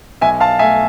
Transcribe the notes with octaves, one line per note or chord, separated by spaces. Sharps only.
B1 E5 G#5
F5 A5
A3 E5 G#5